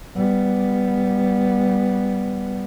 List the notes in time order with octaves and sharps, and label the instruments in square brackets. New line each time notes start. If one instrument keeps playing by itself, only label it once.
[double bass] G3 B3